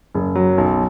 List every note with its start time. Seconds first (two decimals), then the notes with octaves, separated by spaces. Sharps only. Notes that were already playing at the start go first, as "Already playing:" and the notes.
0.14 F#1
0.35 F#3
0.58 B1